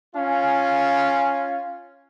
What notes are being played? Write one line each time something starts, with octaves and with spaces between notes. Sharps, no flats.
C#4 F4 F5 G#5